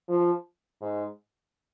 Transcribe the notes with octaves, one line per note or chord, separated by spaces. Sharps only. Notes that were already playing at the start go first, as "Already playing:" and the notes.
F3
G#2